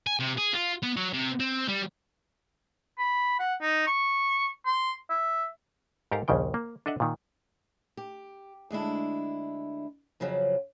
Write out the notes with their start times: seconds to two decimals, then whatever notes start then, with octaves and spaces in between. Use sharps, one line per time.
0.07 G#5
0.20 C3
0.38 G#4
0.54 F4
0.83 B3
0.96 F#3
1.13 C3
1.40 C4
1.68 G3
2.98 B5
3.39 F#5
3.61 D#4
3.87 C#6
4.66 C6
5.10 E5
6.11 G#2 G4 A4 A#4 F5 A#5
6.28 A#1 D#2 C#3 F3 G5
6.54 A#3
6.86 D4 A4 D#5 E5 F#5
7.00 A#2 D#3
7.97 G4
8.71 D2 G#3 D4 E4
10.20 F2 C#3 F3 F#3